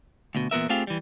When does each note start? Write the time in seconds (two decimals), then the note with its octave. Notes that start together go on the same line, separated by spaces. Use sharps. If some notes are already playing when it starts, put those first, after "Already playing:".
0.35 D2 B2
0.51 E2 A#2 B3 A#4 E5
0.69 A3 C4 F4 G4 G#4 F5
0.87 E3 G3